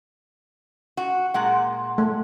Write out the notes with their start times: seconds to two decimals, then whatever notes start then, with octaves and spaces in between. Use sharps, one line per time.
0.97 F#4
1.34 A#2 G#3 F#5
1.98 A3